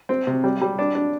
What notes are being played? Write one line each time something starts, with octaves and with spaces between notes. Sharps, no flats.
C4
C3
G3
G3
D4
D4